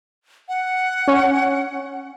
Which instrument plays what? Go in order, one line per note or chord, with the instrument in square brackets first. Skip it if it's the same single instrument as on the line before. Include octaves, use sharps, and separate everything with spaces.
[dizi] F#5
[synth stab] C#4